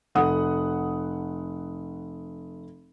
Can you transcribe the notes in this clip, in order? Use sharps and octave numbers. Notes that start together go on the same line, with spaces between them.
F1 F#5 D#6